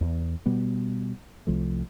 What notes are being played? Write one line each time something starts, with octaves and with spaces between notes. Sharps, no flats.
E2
B2 G3 B3
C2 F3 A3